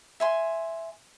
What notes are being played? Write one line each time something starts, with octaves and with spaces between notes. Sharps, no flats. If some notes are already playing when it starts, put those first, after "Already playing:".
E5 G#5 C6